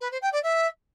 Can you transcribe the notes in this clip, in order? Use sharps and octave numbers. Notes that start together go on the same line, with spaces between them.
B4
C5
G5
D5
E5